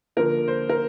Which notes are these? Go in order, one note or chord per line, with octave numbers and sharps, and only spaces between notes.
D3 F3 A#3 A#4
C5
A#4